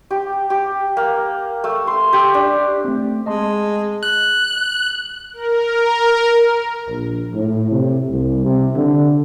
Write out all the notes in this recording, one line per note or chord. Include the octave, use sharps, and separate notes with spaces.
G4
G4
A#3
A3
C6
G4
D4
A3 C4
G#3 D#5 A5 C6
F#6
A#4
A#1
A2
C3
C2
C3
D3